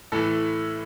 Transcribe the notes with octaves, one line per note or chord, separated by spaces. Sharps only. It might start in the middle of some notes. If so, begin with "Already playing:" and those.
A2 E3 A3 A4